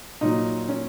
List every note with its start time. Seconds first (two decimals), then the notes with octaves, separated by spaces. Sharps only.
0.21 A#2 F#3 D#4
0.69 C#4